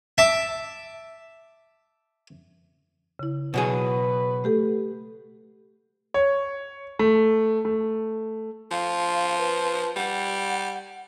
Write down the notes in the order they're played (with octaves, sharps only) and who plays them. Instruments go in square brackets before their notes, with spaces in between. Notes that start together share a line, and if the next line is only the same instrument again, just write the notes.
[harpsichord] E5 A5 D6
[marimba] C#3 E4
[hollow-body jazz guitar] B2 F#3 G#4 [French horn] B4
[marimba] A3 G4 A4
[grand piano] C#5
A3
A3
[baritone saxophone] F3 [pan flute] F5
[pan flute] B4
[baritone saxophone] G3 [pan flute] F#5